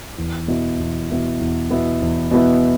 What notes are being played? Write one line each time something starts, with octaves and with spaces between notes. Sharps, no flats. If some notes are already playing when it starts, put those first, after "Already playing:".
E2
B2 B3 E4
E2
B2 B3 E4
E2
B2 B3 E4
E2
B2 B3 E4